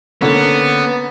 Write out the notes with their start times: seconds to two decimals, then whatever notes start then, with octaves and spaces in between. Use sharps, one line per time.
0.22 D3 A#3 B3 C#4